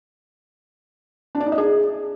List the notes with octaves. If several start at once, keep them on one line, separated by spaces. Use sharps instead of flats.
D4
D5
D#4
D#5
G#4